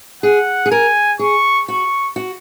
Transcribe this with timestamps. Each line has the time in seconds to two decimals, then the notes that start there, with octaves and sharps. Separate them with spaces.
0.23 G#4 F#5
0.66 G#4
0.71 A#4 G#5
1.19 G#4 C#6
1.68 F#4 C#6
2.16 F#4